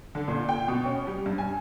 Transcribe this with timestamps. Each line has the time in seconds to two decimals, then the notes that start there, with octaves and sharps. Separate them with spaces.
0.15 D3
0.28 A#2
0.49 G5
0.68 B2
0.85 C#4
1.07 G3
1.26 G2
1.38 G#5